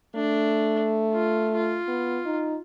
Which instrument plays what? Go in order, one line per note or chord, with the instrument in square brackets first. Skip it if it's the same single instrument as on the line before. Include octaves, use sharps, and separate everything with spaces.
[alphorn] A3 [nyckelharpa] D4
[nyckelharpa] F4
F4
[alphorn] B3
D#4